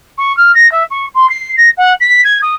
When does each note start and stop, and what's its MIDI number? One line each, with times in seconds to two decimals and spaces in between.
0.18 0.35 85
0.37 0.52 89
0.54 0.70 94
0.72 0.84 76
0.90 1.06 85
1.14 1.28 84
1.29 1.55 96
1.57 1.69 94
1.77 1.93 78
2.00 2.21 95
2.24 2.39 92
2.42 2.55 87